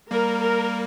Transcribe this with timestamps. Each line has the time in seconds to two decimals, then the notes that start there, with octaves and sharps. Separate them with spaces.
0.11 G3 A#3 A#4
0.42 A#4